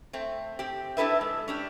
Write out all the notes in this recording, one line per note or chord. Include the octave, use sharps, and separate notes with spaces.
A3 C4
C4 G4
D4 E4 A4 B4 E5
G#3
C#4 D4 G4